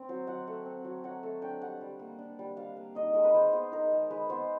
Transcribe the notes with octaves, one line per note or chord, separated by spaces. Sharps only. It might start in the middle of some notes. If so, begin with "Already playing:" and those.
Already playing: C4
F#3 C5
F#3 F#5
A3
C4
F#3
F#3 F#5
A3
D4 G5
G3 F#5
G3
A#3
D4
G3
G3 F5
A#3
D#4 D#5
G#3 A#4
B4
G#3 C5
B3 C5
D#4 A#4
G#3
G#3 B4
B3 C5